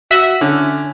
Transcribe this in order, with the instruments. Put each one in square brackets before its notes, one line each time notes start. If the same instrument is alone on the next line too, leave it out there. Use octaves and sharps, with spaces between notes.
[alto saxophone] F#4 [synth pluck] E5
[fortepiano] D3 [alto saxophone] C#4